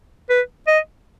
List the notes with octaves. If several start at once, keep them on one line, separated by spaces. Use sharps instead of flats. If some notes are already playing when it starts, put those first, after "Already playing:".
B4
D#5